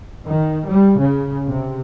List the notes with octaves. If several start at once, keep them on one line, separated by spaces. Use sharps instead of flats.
D#3
G3
C#3
C3